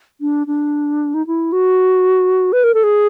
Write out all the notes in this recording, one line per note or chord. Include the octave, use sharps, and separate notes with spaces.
D4
D4
D#4
E4
F#4
B4
A#4
A4
G#4